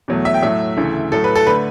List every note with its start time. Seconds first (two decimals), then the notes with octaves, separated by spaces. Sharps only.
0.08 E2 B2 F#3 A3
0.25 E5
0.34 G5
0.42 A2 F#3 A3 E5
0.77 D2 C#3 E3 A3
1.12 A2 F#3 A3 A4
1.24 B4
1.36 A4
1.47 D3 A3 B4